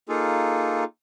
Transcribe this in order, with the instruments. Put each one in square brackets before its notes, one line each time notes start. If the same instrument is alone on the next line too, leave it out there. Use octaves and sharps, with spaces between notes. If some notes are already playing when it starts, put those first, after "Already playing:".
[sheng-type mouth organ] A#3 D#4 F4 G#4 A4